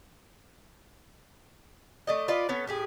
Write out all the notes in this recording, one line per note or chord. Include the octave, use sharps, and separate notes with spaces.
A3 D5 D#5
F4 B4 D5 D#5
B3 C#4 A4
A2 G4 G#4